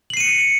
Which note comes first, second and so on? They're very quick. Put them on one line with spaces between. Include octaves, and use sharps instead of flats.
F#7 C7 D#7 C#7